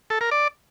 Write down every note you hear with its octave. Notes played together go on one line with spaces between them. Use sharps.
A4
A#4
D5